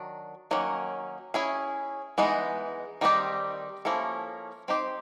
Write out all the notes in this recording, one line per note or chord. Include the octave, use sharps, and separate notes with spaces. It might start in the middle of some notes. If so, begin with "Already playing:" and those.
Already playing: D#3 F#3 D4
D#3 F#3 A#3 C#4
C#4 E4 G#4
E3 G#3 B3 D#4
D#3 G3 C4 D#4 G4
F3 A#3 C#4 E4 A4
C4 D#4 G4 C5